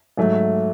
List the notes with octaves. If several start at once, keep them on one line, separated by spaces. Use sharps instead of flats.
G#2 F#3 A3